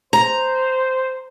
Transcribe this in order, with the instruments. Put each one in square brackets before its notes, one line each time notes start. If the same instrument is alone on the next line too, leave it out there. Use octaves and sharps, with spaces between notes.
[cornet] C5 [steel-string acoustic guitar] A#5